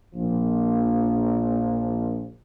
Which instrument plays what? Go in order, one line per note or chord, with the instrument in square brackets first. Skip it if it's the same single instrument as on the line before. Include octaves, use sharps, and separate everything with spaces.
[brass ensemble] A#1 A#2 F3